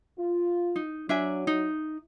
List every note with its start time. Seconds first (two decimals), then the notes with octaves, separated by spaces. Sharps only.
0.19 F4
0.76 D#4
1.09 F#3 D4 E5 G#5
1.47 D#4